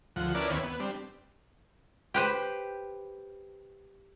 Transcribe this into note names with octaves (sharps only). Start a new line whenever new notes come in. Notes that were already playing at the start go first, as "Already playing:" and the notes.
D2 F3 F#5
C#4 D4 E4 A#4 B4 D5
D#2 C4 E4 B4 C#5
B3
G3 C4 D4
G4 B4 C5